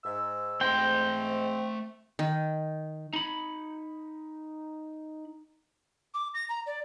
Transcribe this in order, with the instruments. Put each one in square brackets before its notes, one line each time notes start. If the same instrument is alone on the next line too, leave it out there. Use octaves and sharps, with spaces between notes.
[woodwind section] G#2 E6
[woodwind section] G#2 [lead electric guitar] A3 C6 [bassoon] C4 [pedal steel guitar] G5
[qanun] D#3
[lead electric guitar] D#4 B5
[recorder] D6
A#6
A#5
D5